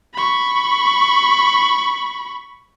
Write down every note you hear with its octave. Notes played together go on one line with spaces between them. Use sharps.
B5 C#6